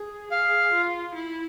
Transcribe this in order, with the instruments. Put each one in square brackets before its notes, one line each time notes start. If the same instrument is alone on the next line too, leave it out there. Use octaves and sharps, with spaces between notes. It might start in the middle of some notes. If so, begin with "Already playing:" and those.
Already playing: [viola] G#4
[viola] G#4 [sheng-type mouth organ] F5
[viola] F4
E4